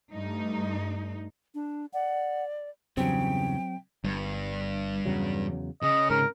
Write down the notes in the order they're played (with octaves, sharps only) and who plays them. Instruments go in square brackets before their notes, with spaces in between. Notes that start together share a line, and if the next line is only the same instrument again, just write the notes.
[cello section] G2 A3 D#4
[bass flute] D4
[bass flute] D5 [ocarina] F#5
[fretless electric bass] E2 G2 [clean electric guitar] C#3 [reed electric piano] F#3 C4 [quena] G5
[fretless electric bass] G1 [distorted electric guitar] G2
[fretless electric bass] E2 C#3 F#3
[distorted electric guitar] C#3 [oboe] D#5
[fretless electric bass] G#2 [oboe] A#4